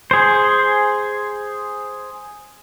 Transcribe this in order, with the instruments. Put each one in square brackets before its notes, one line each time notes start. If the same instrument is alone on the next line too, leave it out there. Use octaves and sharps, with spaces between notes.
[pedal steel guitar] G#4 C5